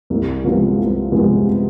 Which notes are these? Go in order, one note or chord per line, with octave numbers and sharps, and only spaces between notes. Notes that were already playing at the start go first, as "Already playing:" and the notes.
C2
C3 F3 G#3 B3
C2
C3 F3 G#3 B3